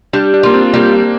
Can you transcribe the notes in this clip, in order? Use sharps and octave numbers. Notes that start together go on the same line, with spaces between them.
G3 D4
D4
A#3 F4
C4
G3 A#3